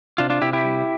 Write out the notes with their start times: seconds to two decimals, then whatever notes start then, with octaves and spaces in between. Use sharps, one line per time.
0.18 C3 D4 F4
0.30 D4 F4
0.42 C3 E4 G4
0.53 E4 G4
0.65 G3